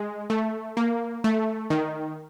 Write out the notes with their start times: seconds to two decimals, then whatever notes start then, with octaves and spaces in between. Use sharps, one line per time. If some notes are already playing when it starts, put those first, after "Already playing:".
Already playing: G#3
0.30 A3
0.77 A#3
1.24 A3
1.70 D#3